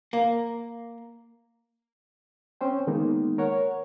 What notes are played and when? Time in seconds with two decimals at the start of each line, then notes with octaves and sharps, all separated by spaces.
0.13 A#3
2.61 C4 C#4 C5 G5
2.87 D#3 G#3 A#3 B3 D#4
3.38 A#4 C#5 F#5